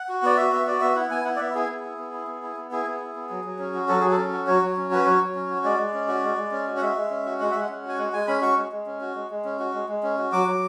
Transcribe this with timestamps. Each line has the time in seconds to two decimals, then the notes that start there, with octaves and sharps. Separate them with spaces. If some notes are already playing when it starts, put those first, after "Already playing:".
Already playing: F#5
0.09 F#4
0.23 B3 D5
0.37 F#4 E5
0.53 B3 E5
0.67 F#4 D5
0.81 B3 E5
0.96 E4 F#5
1.11 B3 G#5
1.25 E4 F#5
1.36 D5
1.40 B3 E5
1.55 E4 G#4
1.69 B3
1.85 E4
1.99 B3
2.13 E4
2.27 B3
2.43 E4
2.57 B3
2.71 E4 G#4
2.87 B3
3.00 E4
3.16 B3
3.30 F#3
3.44 F#3
3.59 C#4
3.74 F#4
3.88 F#3 A4
4.01 F#3 G#4
4.11 A4
4.17 C#4
4.33 F#4
4.47 F#3 C#5
4.62 F#3
4.77 C#4
4.91 F#4 B4
5.06 F#3 C#5
5.21 F#3
5.35 C#4
5.50 F#4
5.64 G#3 D5
5.79 G#3
5.94 C#4
6.08 F#4
6.23 G#3
6.38 G#3
6.51 C#4
6.67 F#4
6.77 F#5
6.81 G#3 E5
6.96 G#3
7.10 C#4
7.26 F#4
7.40 G#3 F#5
7.51 G#3 E5
7.61 F#5
7.69 C#4
7.84 F#4 G#5
7.98 G#3 F#5
8.13 G#3 G#5
8.27 C#4 B5
8.42 F#4 C#6
8.56 G#3
8.72 G#3
8.86 C#4
9.01 F#4
9.15 G#3
9.30 G#3
9.45 C#4
9.59 F#4
9.74 G#3
9.89 G#3
10.03 C#4
10.18 F#4
10.32 F#3 D6
10.47 F#3